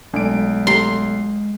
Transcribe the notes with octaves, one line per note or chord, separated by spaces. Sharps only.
B1 G#3 A3 D4 G#5 D7
A3 G4 A#5 C6